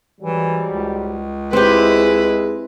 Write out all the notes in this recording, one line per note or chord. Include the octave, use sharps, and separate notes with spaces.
G#2 E3 F#3 G3
C#2
G#3 C4 E4 G4 B4